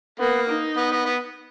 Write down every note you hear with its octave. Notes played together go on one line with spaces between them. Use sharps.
A#3 B3
D#4
B3
B3
B3